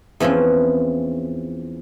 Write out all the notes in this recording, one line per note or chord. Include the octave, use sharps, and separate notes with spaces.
E2 E3 F3 C4 C#4